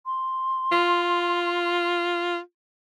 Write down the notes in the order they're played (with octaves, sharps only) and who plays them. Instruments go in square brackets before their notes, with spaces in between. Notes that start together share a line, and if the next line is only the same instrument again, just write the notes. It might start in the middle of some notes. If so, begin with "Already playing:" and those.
[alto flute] C6
[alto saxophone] F4